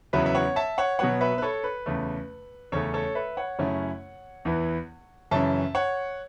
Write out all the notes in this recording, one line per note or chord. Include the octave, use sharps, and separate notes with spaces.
E2 C#3 F#3 B3 E4 B4 E5
E5
C#5 F#5
E5 A5
C#5 F#5
B2 F#3 B3 C#5 F#5
B4 E5
B4
A4 C#5
B4
E2 C#3 A3
E2 C#3 A3 C#4 A4 C#5
A4 C#5
B4 E5
C#5 F#5
F#2 C#3 A3 C#4 E4
E2 E3 B3 E4
F#2 C#3 E3 C#4 E5 A5
C#5 F#5